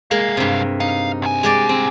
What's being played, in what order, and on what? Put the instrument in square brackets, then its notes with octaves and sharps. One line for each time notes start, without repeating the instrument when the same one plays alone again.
[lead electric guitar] C2 F5 [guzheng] G#3 A#3
[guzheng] G2 C3
[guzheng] D#4 [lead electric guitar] F5
[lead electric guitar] C2 G#5
[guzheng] G#3 G4 D5
C4